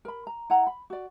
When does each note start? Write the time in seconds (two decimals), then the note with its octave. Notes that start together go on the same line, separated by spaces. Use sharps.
0.05 A#4 B5
0.27 A#5
0.50 E4 F#5 A#5
0.67 B5
0.90 F#4 D5